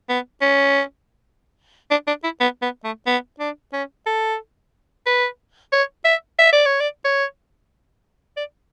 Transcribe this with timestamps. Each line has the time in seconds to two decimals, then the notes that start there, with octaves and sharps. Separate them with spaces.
0.09 B3
0.41 C#4
1.91 D4
2.07 D4
2.24 E4
2.41 B3
2.62 B3
2.84 A3
3.07 B3
3.40 D4
3.73 C#4
4.06 A4
5.06 B4
5.72 C#5
6.05 E5
6.39 E5
6.53 D5
6.66 C#5
6.80 D5
7.05 C#5
8.37 D5